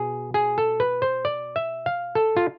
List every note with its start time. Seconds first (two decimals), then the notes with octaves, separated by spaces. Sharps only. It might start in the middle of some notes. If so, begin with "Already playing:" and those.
Already playing: B2 G#4
0.34 G#4
0.58 A4
0.80 B4
1.02 C5
1.25 D5
1.56 E5
1.86 F5
2.15 A4
2.37 F4